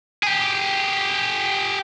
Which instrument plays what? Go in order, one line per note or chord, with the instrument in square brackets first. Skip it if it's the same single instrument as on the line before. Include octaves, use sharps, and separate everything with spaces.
[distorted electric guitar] G4 G#4